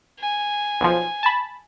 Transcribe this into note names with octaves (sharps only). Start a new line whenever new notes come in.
G#5
B1 F3
A5 B5